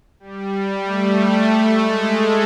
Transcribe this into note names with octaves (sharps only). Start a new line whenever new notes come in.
G3
A3
A3
G#3
A3